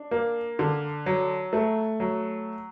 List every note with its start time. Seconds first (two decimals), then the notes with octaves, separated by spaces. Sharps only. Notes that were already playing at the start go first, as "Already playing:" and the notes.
Already playing: D4
0.11 A#3
0.59 D3
1.06 F#3
1.53 A3
2.00 F#3